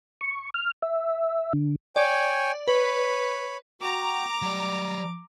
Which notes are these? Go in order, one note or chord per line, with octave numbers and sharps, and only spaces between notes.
C#6
F6
E5
D3
C#5 D5 G5 G#5
B4 C#5 B5
F#4 G5 A#5 D6
F#3 G3 D5